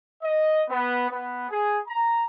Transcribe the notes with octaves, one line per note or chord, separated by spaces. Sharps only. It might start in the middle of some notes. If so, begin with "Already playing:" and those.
D#5
B3
B3
G#4
A#5